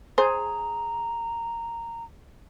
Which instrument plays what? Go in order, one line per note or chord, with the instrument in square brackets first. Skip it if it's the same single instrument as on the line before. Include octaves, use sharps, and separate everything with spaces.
[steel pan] G#4 [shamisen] C5 [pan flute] A#5